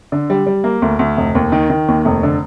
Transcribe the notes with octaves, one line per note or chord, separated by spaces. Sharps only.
D3
G3
G3
A#3
D2
D2
F1
D#2
D#3
D#3
D#2
F1
D3